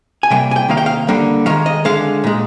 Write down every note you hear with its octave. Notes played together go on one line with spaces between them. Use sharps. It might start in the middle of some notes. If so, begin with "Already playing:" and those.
G#5
C3 G3 A#3 G5
G#5
G5
C3 D#3 A#3 F5
G5
F5
D3 G3 A#3
D#3 G#3 F5
D#5
D3 G#3 F5
A#2 G#3